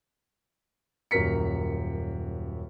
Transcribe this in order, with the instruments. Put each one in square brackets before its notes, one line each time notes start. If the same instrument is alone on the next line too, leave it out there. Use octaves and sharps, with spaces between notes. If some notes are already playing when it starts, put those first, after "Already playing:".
[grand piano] D#1 F#2 F#4 A#4 B6 C#7